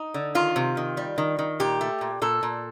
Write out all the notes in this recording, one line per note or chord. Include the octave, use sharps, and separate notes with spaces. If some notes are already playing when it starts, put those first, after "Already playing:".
Already playing: D#4
D3
D#3 F4
C3
D#3
G3
D#3
D#3
A#2 G4
A3
A#2
A#2 A4
A#2